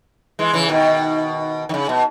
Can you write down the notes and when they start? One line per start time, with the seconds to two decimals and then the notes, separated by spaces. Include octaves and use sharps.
0.39 E3 G#3
0.53 C#3 E3
0.69 B2 D#3
1.69 D#3
1.74 C#3
1.89 B2